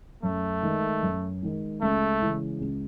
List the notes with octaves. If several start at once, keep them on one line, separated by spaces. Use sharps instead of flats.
F#2 A3
D#3 G#3
F#2
D#3 G#3
C#2 A3
C#3 E3 G#3
C#2